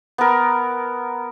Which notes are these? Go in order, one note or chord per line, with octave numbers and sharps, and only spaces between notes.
B3 A#4